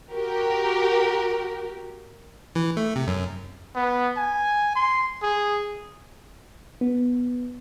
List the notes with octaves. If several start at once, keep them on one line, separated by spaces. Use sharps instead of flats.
F#4 G4 A#4
E3
A3
C3
F#2
B3
G#5
C6
G#4
B3